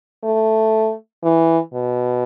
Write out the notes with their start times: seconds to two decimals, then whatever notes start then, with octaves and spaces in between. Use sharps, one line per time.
0.24 A3
1.24 E3
1.74 B2